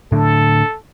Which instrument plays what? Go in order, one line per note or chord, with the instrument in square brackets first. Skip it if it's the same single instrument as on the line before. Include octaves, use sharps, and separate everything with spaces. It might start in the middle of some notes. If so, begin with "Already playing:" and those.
[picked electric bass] A2 D3 [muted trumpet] A4